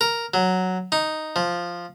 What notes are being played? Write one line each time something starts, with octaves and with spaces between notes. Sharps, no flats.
A#4
F#3
D#4
F3